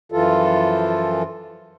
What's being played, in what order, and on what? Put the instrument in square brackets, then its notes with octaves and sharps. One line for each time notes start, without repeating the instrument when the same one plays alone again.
[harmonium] F#2 E3 F3 F4 A4